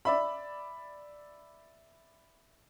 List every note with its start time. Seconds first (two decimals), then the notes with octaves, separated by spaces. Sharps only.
0.05 D5 E5 B5